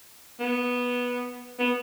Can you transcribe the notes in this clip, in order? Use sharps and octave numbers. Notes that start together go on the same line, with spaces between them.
B3
B3